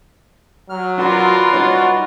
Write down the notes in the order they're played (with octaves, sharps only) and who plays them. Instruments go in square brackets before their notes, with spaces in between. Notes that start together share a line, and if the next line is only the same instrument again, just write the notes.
[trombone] F#3 [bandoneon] F6
[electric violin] F4 A#4 [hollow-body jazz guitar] F#4 [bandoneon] B4 D5 C6
[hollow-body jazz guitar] G3 D#4 C#5 [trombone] F#4